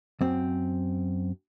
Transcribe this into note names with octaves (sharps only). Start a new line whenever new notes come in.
F#2 C4